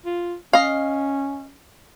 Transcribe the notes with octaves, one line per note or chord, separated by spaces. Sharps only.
F4
C#4 D#5 F5